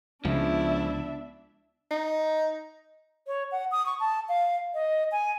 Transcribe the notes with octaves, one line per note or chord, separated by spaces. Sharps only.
C#2 C#3 F3 B3 D4 E4 E5
D#4
C#5
F#5
D#6
C#6
A5
F5
D#5
G#5